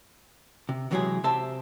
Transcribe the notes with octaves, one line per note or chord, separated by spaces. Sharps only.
C3
C3 E3 F#3 G#3 G4 G#4
C3 C4 G4 C5 E5 A5